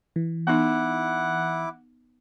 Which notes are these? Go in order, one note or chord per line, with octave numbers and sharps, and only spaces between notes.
E3
B3 D#4 E4 F#5 D6